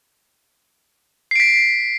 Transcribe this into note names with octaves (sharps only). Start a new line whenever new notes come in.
B6 C7 D7